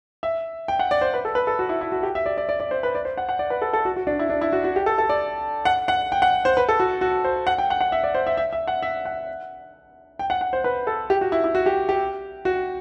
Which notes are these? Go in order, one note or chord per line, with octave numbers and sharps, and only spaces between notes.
E5
G5
F#5
D5
C5
B4
A4
B4
A4
F#4
E4
E4
F#4
G4
E5
D5
D5
D5
D5
C5
B4
D5
C5
F#5
F#5
D5
B4
A4
A4
F#4
F#4
D4
E4
D4
E4
F#4
F#4
G4
A4
A4
D5
F#5
F#5
G5
F#5
C5
B4
A4
F#4
F#4
C5
F#5
G5
F#5
F#5
E5
D5
C5
E5
E5
E5
F#5
E5
F#5
G5
F#5
F#5
C5
B4
A4
G4
F#4
E4
E4
F#4
G4
G4
F#4